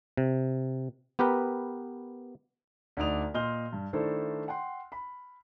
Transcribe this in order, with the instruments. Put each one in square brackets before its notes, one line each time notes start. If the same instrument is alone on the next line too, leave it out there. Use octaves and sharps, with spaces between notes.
[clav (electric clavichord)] C3
B3 G4 A#4 B4 G5
[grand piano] D2 D4 D#4 D5 D#6 F7
A#2 D#5 C6 F6 G6 G7
G2
D#3 A3 D4 E4 A4 C5
F#5 G5 C6
B5